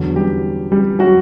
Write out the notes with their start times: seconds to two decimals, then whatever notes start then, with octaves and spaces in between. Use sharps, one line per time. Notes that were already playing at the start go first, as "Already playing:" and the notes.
Already playing: E2 D3 F#3
0.16 G3 G4
0.72 G3 G4
0.99 F#3 F#4